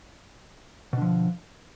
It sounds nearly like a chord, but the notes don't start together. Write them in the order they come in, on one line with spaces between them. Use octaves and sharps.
B2 D3 F3